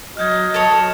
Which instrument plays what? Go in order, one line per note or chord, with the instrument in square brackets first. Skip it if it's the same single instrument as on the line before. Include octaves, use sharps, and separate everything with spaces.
[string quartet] F#3 [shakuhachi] D#5 [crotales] F6 G6 G#6
[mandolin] A4 C#5 [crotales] C#7 E7